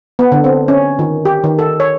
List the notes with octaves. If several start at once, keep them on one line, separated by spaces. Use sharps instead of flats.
B3
D3
C4
C#4
D#3
G4
D#3
A4
C#5